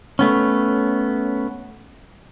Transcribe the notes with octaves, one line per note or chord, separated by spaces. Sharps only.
A3 B3 C#4